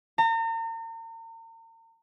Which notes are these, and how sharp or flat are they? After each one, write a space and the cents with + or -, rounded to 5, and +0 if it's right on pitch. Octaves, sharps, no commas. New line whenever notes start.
A#5 -40